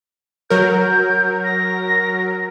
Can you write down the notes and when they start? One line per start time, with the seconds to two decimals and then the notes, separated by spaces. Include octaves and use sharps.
0.50 F#3 A#4 G6
1.44 A#6